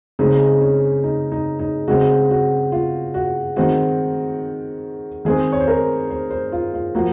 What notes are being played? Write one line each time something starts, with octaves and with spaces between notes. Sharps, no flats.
C#3 G#3 C4 D#4
C#4
D#4
D#4
D#4
C#3 G#3 C4 F#4
F#4
F4
F#4
D#3 G#3 C4 F#4
D#3 G#3 C4 G#4
C#5
C5
A#4
C5
C5
F4
F4
F3 A#3 F#4